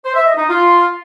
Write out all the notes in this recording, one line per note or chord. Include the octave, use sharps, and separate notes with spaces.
C5
E5
D#5
D#4
F4